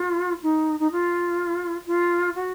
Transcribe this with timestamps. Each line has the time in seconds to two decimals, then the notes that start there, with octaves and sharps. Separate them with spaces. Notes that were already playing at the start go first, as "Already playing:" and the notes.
Already playing: F4
0.43 D#4
0.80 D#4
0.92 F4
1.87 F4
2.35 F#4